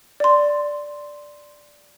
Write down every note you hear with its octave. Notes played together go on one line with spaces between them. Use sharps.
D5 C6